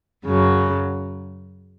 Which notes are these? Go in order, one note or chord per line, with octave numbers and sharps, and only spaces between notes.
F#2 C#3 F#3